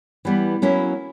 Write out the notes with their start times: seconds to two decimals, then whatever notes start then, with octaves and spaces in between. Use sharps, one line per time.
0.25 E3 G3 B3
0.62 F#3 A#3 C#4 E4